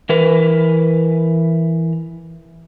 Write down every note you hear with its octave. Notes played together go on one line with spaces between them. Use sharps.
E3 A#4 B4